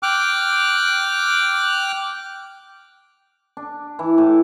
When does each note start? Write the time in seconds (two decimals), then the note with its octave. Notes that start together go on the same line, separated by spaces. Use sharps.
0.03 G5 D6 F6 F#6
3.57 D4
3.99 E3
4.18 A2